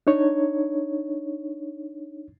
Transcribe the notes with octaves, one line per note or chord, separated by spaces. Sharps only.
D4 D#4 C#5